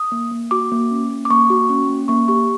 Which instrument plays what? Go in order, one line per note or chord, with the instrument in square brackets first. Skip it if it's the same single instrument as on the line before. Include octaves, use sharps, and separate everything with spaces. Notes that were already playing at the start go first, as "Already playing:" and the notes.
Already playing: [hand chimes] D#6
A#3
A#3
F#4 D6
A#3
C#4
A#3
D6
A#3 C#6
F#4
C#4
A#3
A#3 C#6
G4 C#6